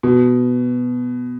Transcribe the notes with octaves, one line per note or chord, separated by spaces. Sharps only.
B2